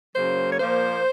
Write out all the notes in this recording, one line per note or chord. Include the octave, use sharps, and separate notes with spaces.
F#2 C#3 F#3 A#3 C5
C#5
A#2 F3 A#3 C5